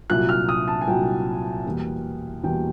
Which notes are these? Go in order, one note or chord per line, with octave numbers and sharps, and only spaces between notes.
C2 A#2 F#3 F#6
F6
D#6
A5
G#5
C2 A#2 F#3 G5
E2 B2 G3 A#3
E2 B2 G3 A#3 G5